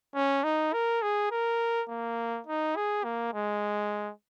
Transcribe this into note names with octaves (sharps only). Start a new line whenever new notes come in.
C#4
D#4
A#4
G#4
A#4
A#3
D#4
G#4
A#3
G#3